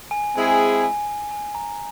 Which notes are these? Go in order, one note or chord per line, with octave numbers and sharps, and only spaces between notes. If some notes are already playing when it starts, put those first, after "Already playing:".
G#5
G#3 C4 E4 G#4 G#5
G#5
G#5
G#5
G#5
A#5